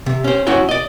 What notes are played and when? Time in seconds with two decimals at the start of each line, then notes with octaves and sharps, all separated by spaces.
0.06 C3
0.24 C#4 C5
0.47 C#4 E4 F#4 C#5 G5
0.69 D5 D#5